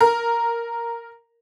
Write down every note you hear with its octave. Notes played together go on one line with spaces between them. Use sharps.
A#4